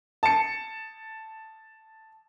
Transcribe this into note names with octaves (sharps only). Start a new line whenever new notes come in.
A5 C#7